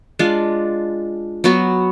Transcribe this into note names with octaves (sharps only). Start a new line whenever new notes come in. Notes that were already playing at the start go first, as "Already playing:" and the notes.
G#3 D4 F4
F#3 B3 F#4